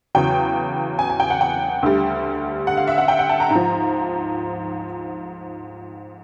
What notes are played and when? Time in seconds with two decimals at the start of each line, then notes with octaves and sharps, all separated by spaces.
0.15 E2 C#3 F#3 G5
0.99 G#5
1.10 G#5
1.20 G5
1.30 F#5
1.41 G5
1.83 D2 D3 G3
2.67 F#5
2.77 F5
2.87 E5
2.98 F#5
3.08 G5
3.19 F#5
3.29 A5
3.40 A#5
3.50 G#2
3.56 F3